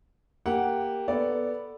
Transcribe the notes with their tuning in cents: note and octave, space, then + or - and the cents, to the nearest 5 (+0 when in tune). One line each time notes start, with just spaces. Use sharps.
A#3 +0 G4 +5 F#5 +0
B3 +0 A4 +0 D5 -10